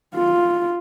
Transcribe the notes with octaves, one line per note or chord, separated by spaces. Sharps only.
F4